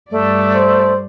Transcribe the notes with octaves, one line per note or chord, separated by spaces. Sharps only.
G2 A3 D5
C5